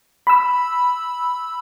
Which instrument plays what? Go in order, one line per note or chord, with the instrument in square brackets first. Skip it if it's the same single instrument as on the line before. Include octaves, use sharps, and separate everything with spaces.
[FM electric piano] B5 E6